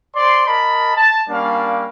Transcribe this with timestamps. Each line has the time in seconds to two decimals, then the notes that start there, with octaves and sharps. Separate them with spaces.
0.14 C5 D5 C6
0.47 A#4 D#5 A5 B5
0.96 A5
1.29 G3 A#3 C#4 D4 F5